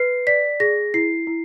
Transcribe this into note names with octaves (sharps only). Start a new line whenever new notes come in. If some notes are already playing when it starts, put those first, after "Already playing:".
Already playing: B4 C7
D5 B6
G#4 A#6
E4 C7
E4